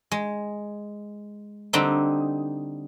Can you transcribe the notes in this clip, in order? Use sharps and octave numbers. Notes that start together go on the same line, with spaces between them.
G#3
D3 G3 C4 D4 D#4